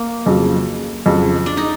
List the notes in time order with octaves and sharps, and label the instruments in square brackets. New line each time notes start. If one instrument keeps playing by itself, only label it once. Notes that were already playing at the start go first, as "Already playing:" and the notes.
Already playing: [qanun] A#3
[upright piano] F2 C#3 F#3
F2 C#3 F#3
[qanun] D4
D#4